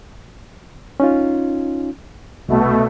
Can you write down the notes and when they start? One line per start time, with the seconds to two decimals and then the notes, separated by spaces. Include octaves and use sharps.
1.00 C#4 D#4 F4
2.49 C2 B2 A3